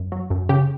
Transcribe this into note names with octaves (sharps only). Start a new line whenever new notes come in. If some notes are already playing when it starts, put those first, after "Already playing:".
Already playing: F#2
F#3
F#2
C#3 G4